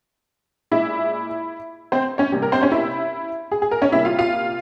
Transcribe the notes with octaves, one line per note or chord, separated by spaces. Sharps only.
A#2 G#3 E4 E5
C4 C5
C#4 C#5
C3 G3 A#3
A#4
C4 C5
C#4 C#5
E4 E5
G#4
G#4
A#4
C#4 C#5
C3 G3 A#3 E4 E5
F4 F5
F4 F5